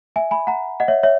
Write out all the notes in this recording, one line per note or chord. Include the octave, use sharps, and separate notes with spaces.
E5 G#5
G#5 B5
F#5 A#5
D#5 F#5
C#5 E5
C#5 E5